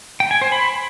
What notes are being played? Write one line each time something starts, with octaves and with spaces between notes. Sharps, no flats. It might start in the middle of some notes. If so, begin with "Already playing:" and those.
G5
G#5
C5
B5